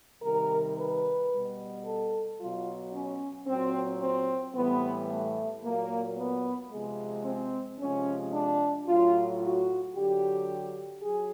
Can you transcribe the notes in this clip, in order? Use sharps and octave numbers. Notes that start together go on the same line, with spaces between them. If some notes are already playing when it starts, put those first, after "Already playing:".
C3 D#3 G3 A#4
B4
G3
B2
A4
B2 F#3 F4
C#4
A#2 F#3 C4
C4
A2 E3 G3 B3
A3
A#2 F#3 A#3
B3
C3 F3 G#3
C4
C3 F3 G#3 C#4
D4
A2 F#3 F4
F#4
D3 F#3 G4
F#3 G#4